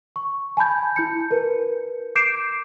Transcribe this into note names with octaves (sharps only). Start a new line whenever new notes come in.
C#6
G#5 A5 B5 G6 G#6
E4 G6 C#7
A#4 B4
D6 G6 C7 D7 E7